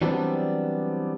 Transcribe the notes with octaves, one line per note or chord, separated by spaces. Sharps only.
E3 F#3 G3 B3 C4 D4